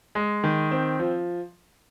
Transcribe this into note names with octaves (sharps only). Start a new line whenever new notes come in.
G#3
D#3
C4
F3